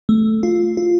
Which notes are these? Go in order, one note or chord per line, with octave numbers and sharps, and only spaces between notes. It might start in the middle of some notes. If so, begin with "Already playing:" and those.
A3
F4
F4